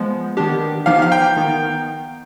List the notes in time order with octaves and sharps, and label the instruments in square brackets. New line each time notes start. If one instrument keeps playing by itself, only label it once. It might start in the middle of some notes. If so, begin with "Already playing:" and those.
Already playing: [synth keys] F3 G#3 B3
D#3 B3 D4 G4
[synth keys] F3 B3 D#4 G4 [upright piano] F5
[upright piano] F5
G5
[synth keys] D#3 B3 D#4